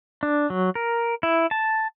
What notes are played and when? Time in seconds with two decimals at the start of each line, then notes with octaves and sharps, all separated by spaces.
0.23 D4
0.50 F#3
0.75 A#4
1.23 E4
1.51 A5